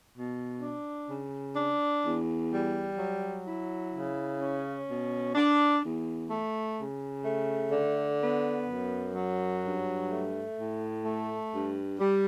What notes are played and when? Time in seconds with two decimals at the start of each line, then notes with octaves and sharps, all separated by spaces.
0.14 B2
0.61 D4
1.09 C#3
1.56 D4
2.04 E2
2.51 G3
2.98 F#3
3.45 E4
3.93 C#3
4.41 C#4
4.88 B2
5.35 D4
5.83 E2
6.30 A3
6.78 C#3
7.25 A3
7.72 D3
8.20 B3
8.67 F#2
9.15 F#3
9.63 G2
10.10 A3
10.57 A2
11.05 A3
11.52 G2
11.99 G3